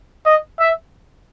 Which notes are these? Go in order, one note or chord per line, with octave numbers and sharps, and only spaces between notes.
D#5
E5